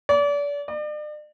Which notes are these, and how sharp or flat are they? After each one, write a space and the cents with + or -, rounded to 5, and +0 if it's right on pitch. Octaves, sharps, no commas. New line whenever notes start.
D5 -35
D5 +40